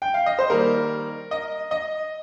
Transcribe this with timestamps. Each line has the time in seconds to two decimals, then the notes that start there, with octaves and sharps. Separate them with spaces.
0.02 G5
0.14 F5
0.26 D#5
0.39 C5
0.50 D#3 G3 A#3 A#4
1.31 D#5
1.71 D#5